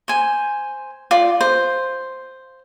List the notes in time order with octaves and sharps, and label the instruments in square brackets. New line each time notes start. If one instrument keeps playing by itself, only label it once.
[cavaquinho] C5 G#5
F4 D5
C5